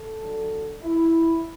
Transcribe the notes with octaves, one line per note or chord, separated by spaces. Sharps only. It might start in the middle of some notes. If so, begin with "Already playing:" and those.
Already playing: A4
D3 F#3
E4